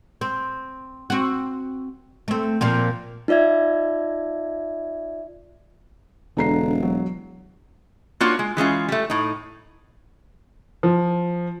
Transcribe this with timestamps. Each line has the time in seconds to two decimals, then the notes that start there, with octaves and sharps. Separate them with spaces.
0.21 C4
1.10 C4 F#4
2.28 A3 C4
2.61 A#2 F3 C4
3.28 D#4 F4 D5 E5 G#6
6.37 E1 D3 A#5 C7
6.82 F#3
8.20 A#3 D4 F4 F#4 C#5
8.39 G#3
8.57 E3 G#3 C#4 F4
8.89 G3 A3
9.10 A2 D#4
10.83 F3